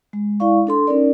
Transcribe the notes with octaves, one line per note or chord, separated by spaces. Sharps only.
G#3
G#3 E4 D5 F5 C#6
D4 A4 C6
C#4 D#4 A#4 D5